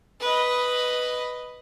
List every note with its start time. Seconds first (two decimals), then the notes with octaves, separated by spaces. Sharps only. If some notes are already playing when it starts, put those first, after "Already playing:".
0.20 B4 D#5